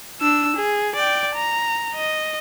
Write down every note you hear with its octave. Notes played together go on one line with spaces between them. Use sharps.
D4 E6
G#4
D5 G5
A#5
D#5